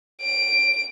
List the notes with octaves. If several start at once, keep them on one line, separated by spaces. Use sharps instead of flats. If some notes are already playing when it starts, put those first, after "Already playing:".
D7